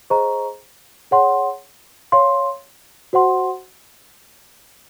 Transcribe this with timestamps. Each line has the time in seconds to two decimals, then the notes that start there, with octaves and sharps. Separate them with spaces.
0.10 G#4 C5 D#5 A#5 C#6
1.11 G#4 C#5 F#5 C6
2.12 C#5 F5 C6
3.13 F#4 C5 F#5 C6